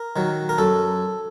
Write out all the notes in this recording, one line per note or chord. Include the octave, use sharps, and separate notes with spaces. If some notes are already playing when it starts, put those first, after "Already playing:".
Already playing: A#4
D#3 F#3
A#4
F#2 A4